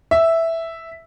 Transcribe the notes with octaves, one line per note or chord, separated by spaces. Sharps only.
E5